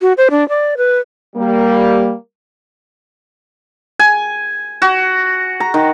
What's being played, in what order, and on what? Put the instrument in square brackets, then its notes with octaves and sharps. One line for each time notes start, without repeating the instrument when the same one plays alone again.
[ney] F#4
C5
D4
D5
B4
[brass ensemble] G3 A#3
[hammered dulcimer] G#5
F#4
A#5
D#3